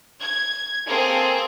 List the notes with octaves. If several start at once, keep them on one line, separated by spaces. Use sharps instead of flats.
G#6
A#3 C4 G#4 A4 C5